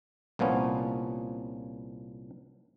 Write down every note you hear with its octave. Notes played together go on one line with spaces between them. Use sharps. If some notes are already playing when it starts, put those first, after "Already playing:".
C2 A#2 F3 B3 C#4